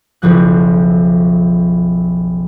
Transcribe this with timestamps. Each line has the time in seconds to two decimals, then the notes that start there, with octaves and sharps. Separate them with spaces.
0.22 F#1 B1 F3 F#6